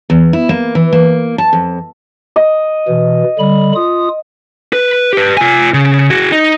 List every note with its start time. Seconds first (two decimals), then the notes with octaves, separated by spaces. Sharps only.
0.10 E2
0.33 E4
0.49 A#3
0.75 E3
0.93 A#3
1.38 A5
1.53 F2
2.36 D#5
2.88 B2 E3
3.39 D3 G3 B5
3.75 F4 D#6
4.73 B4
5.13 G4 B4
5.37 F4 G#5
5.74 C#3
6.10 F#4 G#4
6.32 D#4